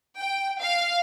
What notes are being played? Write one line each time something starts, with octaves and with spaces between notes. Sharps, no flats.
G5
F5